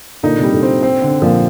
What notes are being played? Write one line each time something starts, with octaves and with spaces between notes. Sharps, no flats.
A#2 D3 D#4
C3
G3
A#2 D3
C4
C4
D3
A#2 F3